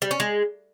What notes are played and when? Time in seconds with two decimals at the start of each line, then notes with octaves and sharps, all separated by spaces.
0.02 G3
0.11 C#4
0.20 G#3